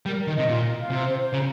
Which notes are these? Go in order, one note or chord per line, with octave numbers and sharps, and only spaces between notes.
G3 A#4
A#4
D#3
C3 D#5
A#2 F4
F4
F4
C3 C5
C5
C5
C#3 A#5